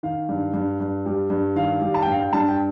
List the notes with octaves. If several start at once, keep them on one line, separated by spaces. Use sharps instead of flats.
D#3 F5
G2
G2
G2
G3
G2
D#3 F5
G3
A5
G5
G2 F5
G5
G2 A5
G5